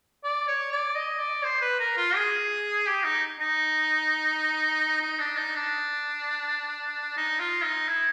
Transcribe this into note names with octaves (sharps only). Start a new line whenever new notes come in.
D5
C#5
D5
D#5
D5
C5
B4
A#4
F4
G#4
G4
D#4
D#4
D#4
D4
D#4
D4
D#4
F4
D#4
E4